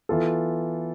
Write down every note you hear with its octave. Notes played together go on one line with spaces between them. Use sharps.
E3 B3 F4 A4